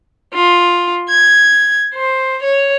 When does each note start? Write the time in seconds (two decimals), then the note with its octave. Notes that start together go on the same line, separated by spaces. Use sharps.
0.34 F4
1.09 G#6
1.95 C5
2.43 C#5